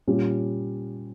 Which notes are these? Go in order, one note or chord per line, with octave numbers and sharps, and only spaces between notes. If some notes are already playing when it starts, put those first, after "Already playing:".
A#2 G3 C#4 F4